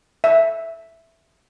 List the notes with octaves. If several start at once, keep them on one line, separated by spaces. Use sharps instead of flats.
E5